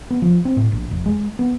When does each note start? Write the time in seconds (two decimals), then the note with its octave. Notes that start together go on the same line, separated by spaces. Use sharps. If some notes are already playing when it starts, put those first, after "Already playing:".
0.11 B3
0.22 F3
0.45 C4
0.57 A2
0.72 A#1
0.91 F1
1.06 G#3
1.39 B3